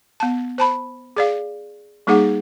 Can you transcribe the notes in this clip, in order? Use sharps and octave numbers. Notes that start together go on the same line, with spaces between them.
B3 A5
C5 A5 B5
G#4 D5 F5
G3 A#3 D#4 G#4 F#5